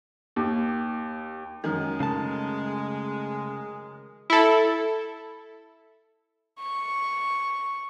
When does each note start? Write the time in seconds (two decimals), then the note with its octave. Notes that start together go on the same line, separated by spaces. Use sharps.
0.36 D#2
1.64 F#2 D#3 G#3
2.00 C#3 A3 A5
4.30 E4 A4
6.60 C#6